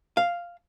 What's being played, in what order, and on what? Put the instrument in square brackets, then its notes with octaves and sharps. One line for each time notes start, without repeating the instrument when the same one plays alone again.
[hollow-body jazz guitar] F5